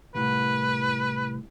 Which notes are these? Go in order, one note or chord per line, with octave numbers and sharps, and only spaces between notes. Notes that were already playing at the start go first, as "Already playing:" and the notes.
C2 A2 C#3 B4